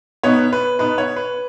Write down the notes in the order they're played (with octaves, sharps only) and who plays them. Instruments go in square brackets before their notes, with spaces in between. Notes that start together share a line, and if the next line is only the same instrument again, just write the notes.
[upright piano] B2 B3 D#4 C#5
B4
B2 B3 D#4 B4
C#5
B4